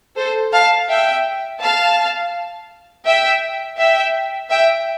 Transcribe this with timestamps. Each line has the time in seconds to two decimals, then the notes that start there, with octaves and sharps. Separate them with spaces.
0.17 A4 C5
0.53 F5 A5
0.89 E5 G5
1.61 F5 A5
3.06 E5 G5
3.78 E5 G5
4.51 E5 G5